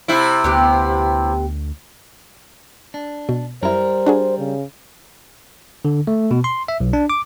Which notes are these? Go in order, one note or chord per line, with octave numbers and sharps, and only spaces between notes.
C3 E4
D2 B3 G4 G5
D4
B2
F#2 G3 E4 A#4 C5
D4 F#4 G#4
C#3
D3
A3
B2
C6
E5
B1
D4
D6